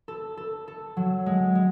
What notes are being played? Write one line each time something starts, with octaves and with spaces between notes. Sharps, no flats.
A4
A4
A4
F#3
G#3
G#3